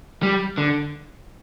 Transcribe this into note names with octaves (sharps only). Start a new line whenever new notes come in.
G3
D3